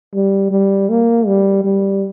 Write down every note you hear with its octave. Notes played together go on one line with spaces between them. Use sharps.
G3
G3
A#3
G3
G3